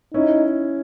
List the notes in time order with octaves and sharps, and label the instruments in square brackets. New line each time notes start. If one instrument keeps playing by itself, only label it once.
[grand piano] C#4 E4 [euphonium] D#4